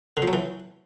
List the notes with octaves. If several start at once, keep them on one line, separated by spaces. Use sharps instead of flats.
D3
F3
F#3
E3